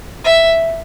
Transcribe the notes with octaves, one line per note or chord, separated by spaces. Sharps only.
E5